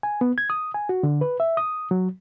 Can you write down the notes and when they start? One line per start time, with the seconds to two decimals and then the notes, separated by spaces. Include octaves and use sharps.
0.03 G#5
0.21 B3
0.38 G#6
0.50 D#6
0.74 G#5
0.89 F#4
1.03 D3
1.21 B4
1.40 E5
1.57 D#6
1.91 F#3